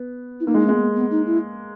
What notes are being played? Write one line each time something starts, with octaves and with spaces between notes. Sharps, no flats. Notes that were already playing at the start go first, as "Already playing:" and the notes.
Already playing: B3
E4
A#3 D#4
G#3
G#3 B3 C#4
B3
D#4
E4